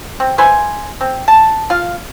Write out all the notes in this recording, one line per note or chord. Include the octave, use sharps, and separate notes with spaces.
C4
B4 C5 E5 G#5
C4
A5
F4 F5